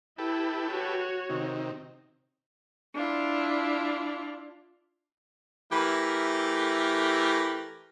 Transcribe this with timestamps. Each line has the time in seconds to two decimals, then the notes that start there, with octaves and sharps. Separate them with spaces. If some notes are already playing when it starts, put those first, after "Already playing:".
0.18 E4 G4 A4 B4
0.69 F#4 C#5
1.29 C3 D#3
2.94 D4 E4 F4
5.72 E3 A3 G4 A#4